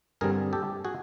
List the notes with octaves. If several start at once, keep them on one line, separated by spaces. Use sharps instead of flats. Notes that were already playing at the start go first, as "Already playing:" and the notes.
G2 D3 G3 C4 G#4 A#4
G4 A4
F#4 G#4